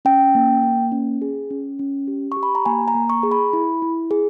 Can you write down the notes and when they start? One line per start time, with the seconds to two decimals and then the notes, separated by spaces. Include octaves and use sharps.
0.05 C#4 G5
0.35 A#3
0.63 A#3
0.92 C#4
1.22 G#4
1.51 C#4
1.79 C#4
2.08 G4
2.32 C#6
2.37 G4
2.43 B5
2.55 A#5
2.66 A#3 G#5
2.88 A#5
2.95 A#3
3.10 C#6
3.23 G#4
3.31 B5
3.53 E4
3.82 E4
4.11 G#4